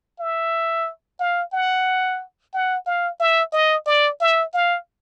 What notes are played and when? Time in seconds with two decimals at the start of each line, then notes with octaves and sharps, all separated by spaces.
0.20 E5
1.20 F5
1.53 F#5
2.54 F#5
2.86 F5
3.20 E5
3.53 D#5
3.86 D5
4.21 E5
4.54 F5